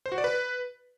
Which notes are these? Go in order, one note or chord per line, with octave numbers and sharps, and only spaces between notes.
C5
F#4
D5
B4